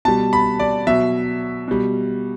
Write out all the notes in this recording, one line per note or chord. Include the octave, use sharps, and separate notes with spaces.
B2 G3 A5
B5
D5
B2 F#3 E5
B2 G3